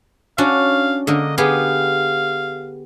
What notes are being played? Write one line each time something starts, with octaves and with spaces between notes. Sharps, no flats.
C#4 D4 F#4 F5
D3 A#3 A#4 D#5
B3 G4 G#4 F5